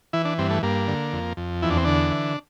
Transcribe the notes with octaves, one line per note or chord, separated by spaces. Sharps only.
E3 E4
D4
G2 C4
A3
G2 A#3
D3
F2
F2
E2 E4
D4
C4
D3 D4
E3